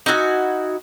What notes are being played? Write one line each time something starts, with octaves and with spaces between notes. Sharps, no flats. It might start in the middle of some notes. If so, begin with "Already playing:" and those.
D#4 E4 F#4 G#5